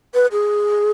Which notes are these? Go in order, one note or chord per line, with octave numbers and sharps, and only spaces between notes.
B4
G#4